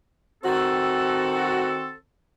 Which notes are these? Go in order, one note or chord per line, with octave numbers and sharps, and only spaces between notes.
D#3 C4 F#4 A4